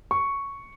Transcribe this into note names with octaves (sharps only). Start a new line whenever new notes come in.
C#6